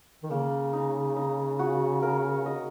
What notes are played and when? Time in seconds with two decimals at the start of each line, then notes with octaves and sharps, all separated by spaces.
0.23 D#3
0.31 C#3 A#3
0.73 D#4
1.16 D#4
1.59 F#4
2.03 A#4
2.46 D#5